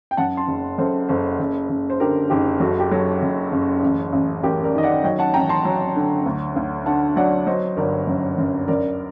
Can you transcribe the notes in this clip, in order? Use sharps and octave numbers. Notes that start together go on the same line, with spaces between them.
G5
F#2 F#5 A5
A5 C6
F#1
F#2 A4 C5
F#1 A4 C5
F#1
F#1
C5
D3 G4 A#4
F#1 D#4 G4
F#2 F#4 A4
G4
F#3 F#4 A4
F#1
F#1
A1
A1
A1 G4 A#4
A#4 D5
D#3 D#5
D5 F#5
F#3 D#5 G5
F#5 A5
A1 G5 A#5
A5 C6
F#3
D3
D2
D2
D3 F#5 A5
F#3 D5 F#5
F#3 C5 D#5
G1 A#4 D5
F#2
F#2
F#2 A#4 D5